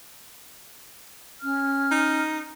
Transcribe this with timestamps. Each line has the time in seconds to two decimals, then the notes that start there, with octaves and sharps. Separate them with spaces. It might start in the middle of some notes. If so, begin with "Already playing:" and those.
1.41 C#4 F6
1.91 D#4